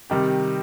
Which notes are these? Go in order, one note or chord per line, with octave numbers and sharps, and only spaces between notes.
C3 D#3 G3 D#4 G4